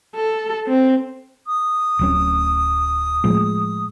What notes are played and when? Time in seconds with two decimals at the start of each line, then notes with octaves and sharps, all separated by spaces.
0.16 A4
0.67 C4
1.47 D#6
1.99 D1 F#3 C#4
3.24 A2 F3 G#3